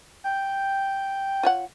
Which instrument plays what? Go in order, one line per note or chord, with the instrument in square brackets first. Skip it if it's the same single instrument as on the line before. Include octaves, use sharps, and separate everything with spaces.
[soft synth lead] G5
[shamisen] F4 C#5 F#5